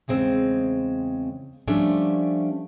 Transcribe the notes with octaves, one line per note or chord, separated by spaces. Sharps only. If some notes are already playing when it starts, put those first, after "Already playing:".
E2 C#3 G#3 C4
F3 G3 A3 C#4 D4